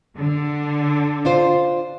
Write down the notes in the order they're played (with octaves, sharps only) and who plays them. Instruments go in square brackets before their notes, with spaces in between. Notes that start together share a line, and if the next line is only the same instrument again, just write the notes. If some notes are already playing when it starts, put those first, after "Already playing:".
[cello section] D3
[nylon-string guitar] D4 F4 C5